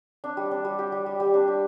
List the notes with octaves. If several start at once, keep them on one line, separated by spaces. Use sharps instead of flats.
D4
G3
D4
G3
G4
G3
G3
G3
D4
G4